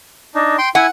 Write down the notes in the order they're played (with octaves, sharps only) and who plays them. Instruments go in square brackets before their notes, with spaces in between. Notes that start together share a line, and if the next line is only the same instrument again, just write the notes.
[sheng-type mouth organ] D4 D#4
G5 C6
[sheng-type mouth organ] E4 G#5 [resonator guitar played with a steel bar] F#5